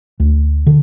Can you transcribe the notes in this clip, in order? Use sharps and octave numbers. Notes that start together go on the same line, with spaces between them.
D2
D3